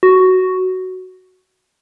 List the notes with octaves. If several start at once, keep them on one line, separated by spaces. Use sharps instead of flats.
F#4